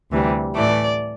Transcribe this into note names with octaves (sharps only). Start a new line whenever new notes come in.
D2 C3 E3 G3
A2 E3 A3 D5